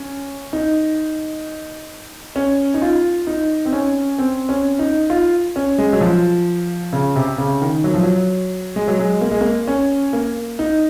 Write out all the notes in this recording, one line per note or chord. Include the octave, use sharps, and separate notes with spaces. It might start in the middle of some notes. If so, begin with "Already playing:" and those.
Already playing: C#4
D#4
C#4
D#4
F4
D#4
C4
C#4
C4
C#4
D#4
F4
C#4
G#3
F#3
F3
C#3
C3
C#3
D#3
F#3
F3
F#3
G#3
F#3
G#3
A#3
G#3
A#3
C#4
A#3
D#4